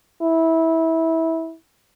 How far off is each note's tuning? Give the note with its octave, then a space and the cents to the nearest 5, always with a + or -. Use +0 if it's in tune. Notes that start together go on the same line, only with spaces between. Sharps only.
E4 -20